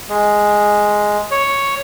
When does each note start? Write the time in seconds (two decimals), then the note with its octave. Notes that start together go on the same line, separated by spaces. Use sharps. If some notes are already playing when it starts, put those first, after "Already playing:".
0.09 G#3
1.31 C#5